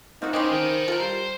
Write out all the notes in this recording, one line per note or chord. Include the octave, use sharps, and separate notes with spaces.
F3 A#3 C4 D#4 F#4 F5
G#3 C4 C#4 D#4 G4 C5 B5
D#3 D#5 G5
F4 A4 A#4
G3 C5